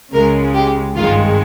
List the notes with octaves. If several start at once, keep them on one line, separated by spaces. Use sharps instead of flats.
C#2 C#3 G#3 A#4
G4
G#1 G2 D#3 G#3 F4